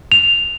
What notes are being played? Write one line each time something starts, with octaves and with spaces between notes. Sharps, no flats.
F7